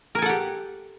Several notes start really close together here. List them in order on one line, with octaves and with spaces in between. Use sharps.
A#4 G#5 A4 F#5 G4